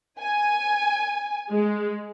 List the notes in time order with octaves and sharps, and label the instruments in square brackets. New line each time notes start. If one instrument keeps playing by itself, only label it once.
[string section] G#5
G#3